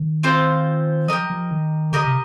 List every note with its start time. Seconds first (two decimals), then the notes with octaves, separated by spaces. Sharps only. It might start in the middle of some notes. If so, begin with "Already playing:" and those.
Already playing: D#3
0.23 C4 F4 C5
1.08 F3 G4 A#4 D#5
1.30 F3
1.51 D#3
1.92 D3 G4 A#4 D#5
2.05 C3